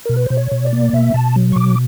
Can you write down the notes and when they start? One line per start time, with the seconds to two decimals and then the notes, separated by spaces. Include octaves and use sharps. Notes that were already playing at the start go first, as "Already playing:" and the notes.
0.05 B2 A#4
0.16 B4
0.26 B2 C5
0.37 C#5
0.52 B2
0.65 D5
0.73 A#3
0.93 B2 E5
1.14 B2 A5
1.36 F#3
1.52 C#6
1.56 B2 D6